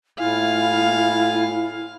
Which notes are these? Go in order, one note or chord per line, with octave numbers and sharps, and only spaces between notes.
A2 E4 F4 F5 G#5